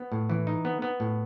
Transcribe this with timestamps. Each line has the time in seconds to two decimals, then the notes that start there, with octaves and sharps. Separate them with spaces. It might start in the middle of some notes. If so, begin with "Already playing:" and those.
Already playing: B3
0.12 A2
0.30 E3
0.47 D#4
0.65 B3
0.82 B3
1.00 A2